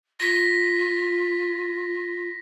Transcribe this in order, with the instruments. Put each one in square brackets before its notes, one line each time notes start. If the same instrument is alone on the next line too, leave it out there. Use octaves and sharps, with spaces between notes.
[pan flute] F4 [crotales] A#6 B6